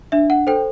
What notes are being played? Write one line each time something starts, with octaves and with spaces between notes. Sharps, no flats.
D4 E5
F#5
A4 C5 G5